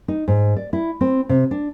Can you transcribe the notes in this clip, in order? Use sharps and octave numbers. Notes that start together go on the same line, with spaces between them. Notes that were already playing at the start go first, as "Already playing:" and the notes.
D#4
G#2
D5
E4
C4
C3
D4